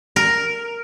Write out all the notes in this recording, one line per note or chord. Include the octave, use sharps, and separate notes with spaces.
A#4